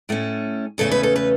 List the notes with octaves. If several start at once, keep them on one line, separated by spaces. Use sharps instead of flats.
A2 A3 C#4
E2 C#3 A3 C#4 A4
B4
A4
B4